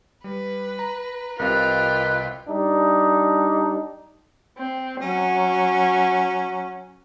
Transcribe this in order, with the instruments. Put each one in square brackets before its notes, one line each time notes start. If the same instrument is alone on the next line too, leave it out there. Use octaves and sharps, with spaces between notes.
[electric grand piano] G3 [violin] B4
[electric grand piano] A#5
[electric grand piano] C2 C3 [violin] F4 G5 [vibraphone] A#4 D#5 F5 [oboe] B4
[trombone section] G3 D4 D#4
[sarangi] C4
[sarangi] F#3 [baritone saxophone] C#4